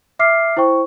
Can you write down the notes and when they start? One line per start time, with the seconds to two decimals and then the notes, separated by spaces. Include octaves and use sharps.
0.19 E5 D6 F6 C7
0.57 E4 C5 G5 C#6